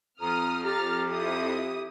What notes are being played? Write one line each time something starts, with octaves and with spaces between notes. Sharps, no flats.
F2 A#5 D#6 F6
G4 A#5 F6 A6
E4 D#6